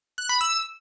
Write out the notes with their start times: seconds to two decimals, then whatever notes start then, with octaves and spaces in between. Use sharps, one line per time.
0.18 F#6
0.29 B5
0.41 E6